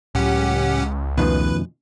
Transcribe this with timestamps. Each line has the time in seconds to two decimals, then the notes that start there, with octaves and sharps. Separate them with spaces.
0.15 C#2 A2 F#3 C#4 G4 F#5
1.18 F2 B2 D#3 F3 A3 C#4 B4